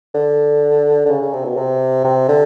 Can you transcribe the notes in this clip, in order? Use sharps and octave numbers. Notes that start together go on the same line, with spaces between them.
D3
D3
C#3
C#3
C3
B2
C3
C3
D3